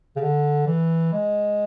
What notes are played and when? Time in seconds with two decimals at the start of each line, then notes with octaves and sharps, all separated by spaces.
0.16 C#3
0.21 D3
0.67 E3
1.13 G#3